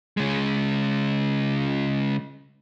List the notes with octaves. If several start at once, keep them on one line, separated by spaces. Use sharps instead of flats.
C#3 G#3